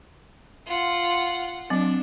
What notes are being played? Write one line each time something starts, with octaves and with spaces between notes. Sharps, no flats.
F4 F#5
F#3 C4 D4